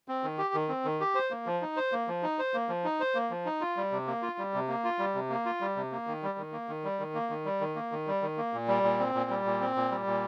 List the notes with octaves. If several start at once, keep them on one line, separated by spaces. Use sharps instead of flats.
C4
D#3
G4
D#3
C4
D#3
G4
C5
A#3
F3
D#4
C5
A#3
F3
D#4
C5
A#3
F3
D#4
C5
A#3
F3
D#4
F4
G3
C3
A#3
F4
G3
C3
A#3
F4
G3
C3
A#3
F4
G3
C3
A#3
D#3
G3
D#3
A#3
D#3
G3
D#3
A#3
D#3
G3
D#3
A#3
D#3
G3
D#3
A#3
A#2
G3
A#2
C4
A#2
G3
A#2
C4
A#2
G3
A#2